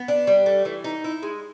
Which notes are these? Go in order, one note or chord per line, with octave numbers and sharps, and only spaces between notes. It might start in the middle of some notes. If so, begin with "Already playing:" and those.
Already playing: B3
D4
G3
A3
E3
D#4
E4
G#3